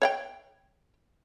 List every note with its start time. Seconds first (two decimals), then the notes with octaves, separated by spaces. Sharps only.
0.02 C#5 F#5 G5